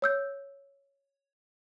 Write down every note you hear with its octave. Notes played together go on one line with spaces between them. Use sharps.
C#5 E6 G6